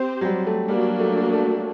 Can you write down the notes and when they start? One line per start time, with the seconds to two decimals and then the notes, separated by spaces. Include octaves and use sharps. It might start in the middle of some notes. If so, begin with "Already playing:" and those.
Already playing: C4 G4 C5
0.21 F#3
0.25 G3
0.47 A3
0.68 F#3 G3 A#3 D4
1.00 A3
1.33 A3